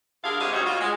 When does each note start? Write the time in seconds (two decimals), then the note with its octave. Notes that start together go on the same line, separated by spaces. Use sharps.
0.24 G2 D3 G#4 A#4 F5
0.40 C3 G#3 G4 C#5 D#5 F5
0.53 D2 G3 C#4 D#4 F#4 C#5
0.66 F4 F#4
0.81 G#3